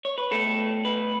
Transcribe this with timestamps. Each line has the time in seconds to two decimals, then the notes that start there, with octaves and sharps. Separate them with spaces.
0.05 C#5
0.18 B4
0.31 B2 A3 A4
0.85 B4